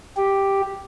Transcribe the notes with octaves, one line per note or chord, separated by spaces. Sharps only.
G4